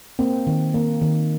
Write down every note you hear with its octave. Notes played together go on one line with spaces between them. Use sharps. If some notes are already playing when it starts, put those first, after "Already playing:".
A#3 C4
D#3
A#3
D#3